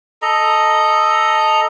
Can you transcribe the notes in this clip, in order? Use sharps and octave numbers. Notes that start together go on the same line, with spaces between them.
A4 D#5 A#5